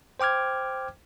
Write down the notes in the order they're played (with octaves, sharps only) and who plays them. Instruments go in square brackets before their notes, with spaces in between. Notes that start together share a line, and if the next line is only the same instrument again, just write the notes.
[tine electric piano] C5 G5 D6 F6 G#6